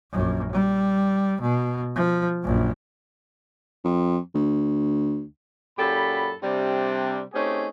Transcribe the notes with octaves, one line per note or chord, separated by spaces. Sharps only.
A#1 F#2
G3
B2
F3
A#1 F#2
F2
D2
F#2 A#2 G4 A4 B5
C3 G3 D4
A3 C4 C#4 D#4 G4 G#4